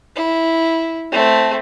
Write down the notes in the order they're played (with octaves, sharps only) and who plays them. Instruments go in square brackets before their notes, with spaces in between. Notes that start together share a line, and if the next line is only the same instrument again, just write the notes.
[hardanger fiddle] E4
A3 C4